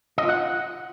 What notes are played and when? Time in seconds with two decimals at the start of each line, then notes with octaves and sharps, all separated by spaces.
0.18 D#5
0.23 F4
0.29 F#5